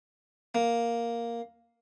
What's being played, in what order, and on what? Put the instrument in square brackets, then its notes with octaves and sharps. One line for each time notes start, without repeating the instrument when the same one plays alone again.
[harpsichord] A#3